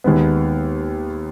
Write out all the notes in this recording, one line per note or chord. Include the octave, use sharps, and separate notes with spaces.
D#2 D#3 G#3 B3